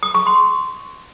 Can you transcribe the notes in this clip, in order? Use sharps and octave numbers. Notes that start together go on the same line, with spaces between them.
D#6
C#6
C6